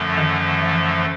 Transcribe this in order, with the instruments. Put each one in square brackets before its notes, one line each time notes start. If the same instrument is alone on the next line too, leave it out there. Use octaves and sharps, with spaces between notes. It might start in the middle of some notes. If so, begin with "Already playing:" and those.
Already playing: [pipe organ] F#2 D3 F3 A3
[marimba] D#3
E3